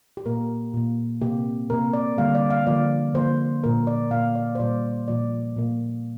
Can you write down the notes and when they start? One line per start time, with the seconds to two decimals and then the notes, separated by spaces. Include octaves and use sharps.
0.17 G4
0.26 A#2 A#3 A#4
0.74 A#2 A#3
1.21 C3 A#3 G4
1.70 C3 A#3 A#4
1.93 D5
2.18 D3 G3 A#3 F5
2.35 D5
2.50 F5
2.66 D3 F3 A#3 D5
3.14 D3 F3 A#3 C5
3.63 A#2 A#3 A#4
3.87 D5
4.11 A#2 A#3 F5
4.35 D5
4.55 C5
4.60 A#2 G3 A#3 D5
5.08 A#2 F3 A#3 D5
5.57 A#2 A#3